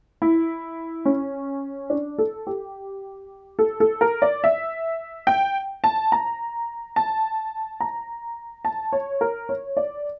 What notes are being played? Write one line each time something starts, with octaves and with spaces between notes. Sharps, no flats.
E4
C#4
D4
A4
G4
A4
A4
A#4
D5
E5
G5
A5
A#5
A5
A#5
A5
C#5
A#4
C#5
D5